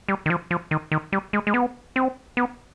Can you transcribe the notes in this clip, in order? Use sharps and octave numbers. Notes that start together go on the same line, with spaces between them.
G3
D#3
F3
F3
D#3
D#3
G3
G#3
G#3
B3
C4
B3